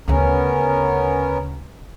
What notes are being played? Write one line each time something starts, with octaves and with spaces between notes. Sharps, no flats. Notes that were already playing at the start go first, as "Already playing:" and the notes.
D2 C#3 B3 C#4 A#4